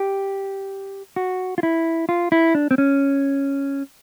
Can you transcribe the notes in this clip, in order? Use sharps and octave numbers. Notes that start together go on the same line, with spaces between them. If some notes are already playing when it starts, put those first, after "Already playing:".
Already playing: G4
F#4
F4
E4
F4
E4
D4
C4
C#4